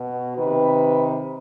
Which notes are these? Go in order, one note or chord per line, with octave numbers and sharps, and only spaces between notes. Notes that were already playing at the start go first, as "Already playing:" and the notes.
Already playing: B2
C3 D#3 B4